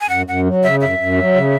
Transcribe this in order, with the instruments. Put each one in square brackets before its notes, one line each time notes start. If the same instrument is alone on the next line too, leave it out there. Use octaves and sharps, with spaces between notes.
[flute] G#5
[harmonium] F#2 [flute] F#5
[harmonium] F#2 [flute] F#5
[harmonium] F#3
[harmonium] C#3 [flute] E5
[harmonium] F#2 [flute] E5
[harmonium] F#2
F#3
C#3